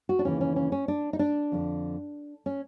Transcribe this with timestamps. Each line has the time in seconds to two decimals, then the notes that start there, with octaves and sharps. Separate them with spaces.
0.09 F#4
0.19 D4
0.25 D#2 C#3 E3 C#4
0.41 C#4
0.56 C#4
0.72 C#4
0.88 D4
1.13 D#4
1.19 D4
1.52 F2 D3
2.46 C#4